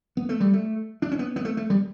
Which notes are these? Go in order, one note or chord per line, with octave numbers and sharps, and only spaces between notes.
B3
A3
G3
A3
D4
C#4
B3
B3
A3
A3
G3